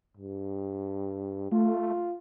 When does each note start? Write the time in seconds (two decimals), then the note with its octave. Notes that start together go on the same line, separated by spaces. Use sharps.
0.17 G2
1.52 A3 F4